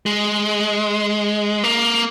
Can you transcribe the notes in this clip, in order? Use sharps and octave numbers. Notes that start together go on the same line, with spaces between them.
G#3
A#3